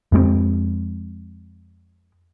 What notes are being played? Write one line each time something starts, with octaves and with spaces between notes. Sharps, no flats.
F2 G#3 A3 C4